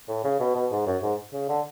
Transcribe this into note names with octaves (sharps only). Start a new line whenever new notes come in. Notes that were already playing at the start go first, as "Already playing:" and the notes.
A2
C#3
B2
B2
G#2
F#2
G#2
C#3
D3